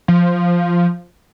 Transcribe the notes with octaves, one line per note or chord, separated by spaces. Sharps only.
F3